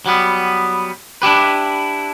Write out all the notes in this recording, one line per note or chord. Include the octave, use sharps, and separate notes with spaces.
F#3 G3 B3
D4 E4 G4 B4